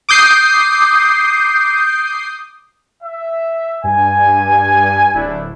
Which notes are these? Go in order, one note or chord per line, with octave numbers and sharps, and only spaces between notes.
D6 D#6 G6 C7
E5
G2 G#5
D1 A3 D4 E4